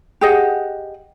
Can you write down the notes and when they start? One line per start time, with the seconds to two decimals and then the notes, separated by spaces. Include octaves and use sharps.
0.21 G4 G#4 D#5 F#5